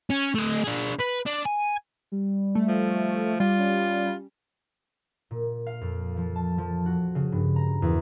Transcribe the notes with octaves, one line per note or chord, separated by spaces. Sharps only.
C#4
A3 D#5
D4 G#4
B4
D4
G#5
G3
A3
F3
G3 F4
C#4
A#2
F5
F2
F3
A5
F3
F#4
C#3
G2
A#5
E2